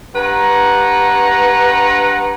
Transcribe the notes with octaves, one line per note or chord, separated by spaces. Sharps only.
G2 B4 F#5 A#5